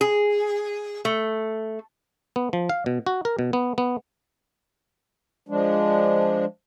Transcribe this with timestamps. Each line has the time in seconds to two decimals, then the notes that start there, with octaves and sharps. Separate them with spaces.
0.01 G#4
1.05 A3
2.36 B3
2.53 F3
2.69 F5
2.86 B2
3.07 F#4
3.25 A#4
3.39 B2
3.53 B3
3.78 B3
5.49 F3 G#3 D4